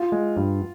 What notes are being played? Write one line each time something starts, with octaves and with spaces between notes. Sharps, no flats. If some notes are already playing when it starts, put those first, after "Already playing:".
Already playing: F4
G#3
G2